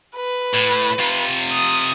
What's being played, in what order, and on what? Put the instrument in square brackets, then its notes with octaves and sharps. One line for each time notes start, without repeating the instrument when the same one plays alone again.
[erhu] B4
[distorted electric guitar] A2
C3 F4
[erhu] D#6